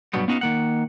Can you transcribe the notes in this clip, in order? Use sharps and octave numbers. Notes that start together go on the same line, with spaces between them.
G2 B2 F#3 G3 B3
B3 C#4 D#4 F#4 D#5 F5
D#3 A#3 F#5